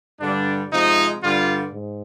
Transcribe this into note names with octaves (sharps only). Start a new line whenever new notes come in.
G2 D3 G3 D4
C3 F3 G#3 D#4
G2 D3 G3 F4
G#2